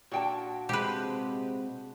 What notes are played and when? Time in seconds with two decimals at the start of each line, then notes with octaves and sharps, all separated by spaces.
0.11 A#2 D4 F#4 G5 A5
0.69 C3 G#3 G4 B4